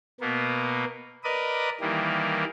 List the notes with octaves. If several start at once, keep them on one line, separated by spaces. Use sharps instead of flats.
B2 A#3 B3
A#4 B4 D5 D#5 D#6
D#3 E3 G3 A#3